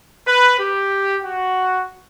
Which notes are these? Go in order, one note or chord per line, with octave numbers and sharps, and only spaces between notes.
B4
G4
F#4